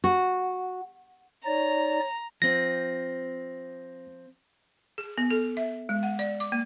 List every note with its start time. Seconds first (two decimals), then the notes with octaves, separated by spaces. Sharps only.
0.04 F#4
1.45 D#4 C#5 D5 A#5
2.42 F3 C4 A#6
4.98 G#4
5.18 B3
5.31 A4
5.57 E5
5.89 G#3
6.03 F#5
6.19 D5
6.40 D6
6.52 A#3